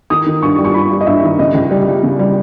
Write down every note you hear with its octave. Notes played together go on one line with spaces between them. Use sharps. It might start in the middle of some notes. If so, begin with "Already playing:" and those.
D#3 D#6
D#3
G2 C#6
G3
C#6
G3 B5
G3
D#5
G2 E5
D#3
C#3 D#5
C#2
G3
G3
C#3
G3